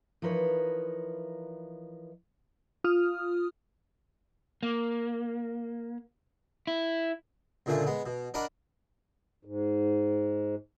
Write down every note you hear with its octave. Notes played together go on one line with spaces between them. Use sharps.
E3 F3 D#4 A#4 B4 C#5
F4 D#6 F6
A#3
E4
C#2 A#2 D3 A3 G#4
G#3 B3
B2
D4 A#4 D#5 F#5 B5
G#2